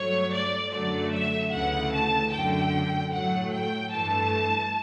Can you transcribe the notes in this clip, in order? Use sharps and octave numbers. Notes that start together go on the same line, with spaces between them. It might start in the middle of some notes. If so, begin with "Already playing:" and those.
Already playing: G2 F#3 A3 C#5
D5
F#2 D3 F#3 A3 D5
E5
D2 C#3 E3 A3 F#5
A5
F#2 D3 A3 G5
A2 F#3 A3 F#5
G5
G2 E3 A3 A5